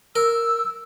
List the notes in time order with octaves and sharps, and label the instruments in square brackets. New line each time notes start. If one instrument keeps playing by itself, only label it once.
[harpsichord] A#4 [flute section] E6